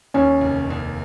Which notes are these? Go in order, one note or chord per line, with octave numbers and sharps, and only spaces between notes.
D#2 C#4
F1
D#2